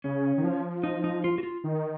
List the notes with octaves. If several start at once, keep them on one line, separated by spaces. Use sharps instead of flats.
C#3 C#4
D#3
F3
D#4
D#4
F4
F#4
F4
D#3